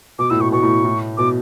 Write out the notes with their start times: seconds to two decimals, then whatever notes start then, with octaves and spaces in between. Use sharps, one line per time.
0.19 B2 D6
0.30 A2 E6
0.40 B2 C#6
0.52 B2 C#6
0.63 A2
0.85 A2
1.17 B2 D6